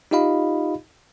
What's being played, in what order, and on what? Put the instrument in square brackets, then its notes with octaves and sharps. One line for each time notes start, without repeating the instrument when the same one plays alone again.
[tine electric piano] D#4 F4 G4 D#5 F5 B5